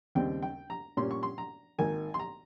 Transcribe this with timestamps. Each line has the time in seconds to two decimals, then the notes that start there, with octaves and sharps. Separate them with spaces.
0.15 D#2 C#3 G3 C4 G5
0.43 G5
0.70 A#5
0.97 A#2 G3 C#4 C6
1.11 C#6
1.23 C6
1.38 A#5
1.78 G#1 G#2 D#3 A#3 G#5
2.14 C6
2.20 A#5